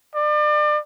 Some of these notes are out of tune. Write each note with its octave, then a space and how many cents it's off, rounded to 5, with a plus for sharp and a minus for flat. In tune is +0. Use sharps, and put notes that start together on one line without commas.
D5 +35